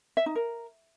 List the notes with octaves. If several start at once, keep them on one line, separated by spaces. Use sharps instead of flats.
E5
D#4
A#4